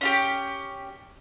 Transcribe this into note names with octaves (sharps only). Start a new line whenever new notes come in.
C#4 F4 G4